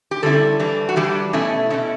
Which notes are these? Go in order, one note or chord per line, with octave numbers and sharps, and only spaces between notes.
G4
D3 G3 C#4 E4 A4
E3 G3 D4
F#4
E3 G3 D4 G4
B2 A3 C#4 E4
B2 A3 C#4 E4